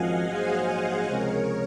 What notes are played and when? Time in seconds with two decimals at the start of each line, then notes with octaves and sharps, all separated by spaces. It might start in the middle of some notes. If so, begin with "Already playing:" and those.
Already playing: G#1 F#2 F3 D#5 F5 F#5 G#5
0.28 A#1 G#2 F#3 G#4 C5
1.08 C#2 C3 F3 G#3 C4 A#4 C#5